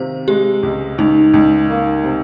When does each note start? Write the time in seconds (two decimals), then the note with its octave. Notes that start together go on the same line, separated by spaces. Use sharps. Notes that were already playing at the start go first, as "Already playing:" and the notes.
Already playing: C3 D#3 F4 C5
0.28 G#3 G4
0.63 C#2
0.98 C#2 D#4
1.34 C#2
1.70 A#3
2.04 C3